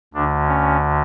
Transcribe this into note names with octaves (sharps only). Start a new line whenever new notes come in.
D2 D3 D4
C#4